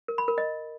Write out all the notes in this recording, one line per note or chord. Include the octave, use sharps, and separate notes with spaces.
A#4
B5
A#4
D#5